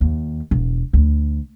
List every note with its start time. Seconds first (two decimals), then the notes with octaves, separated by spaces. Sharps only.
0.01 D#2
0.51 E1
0.93 D2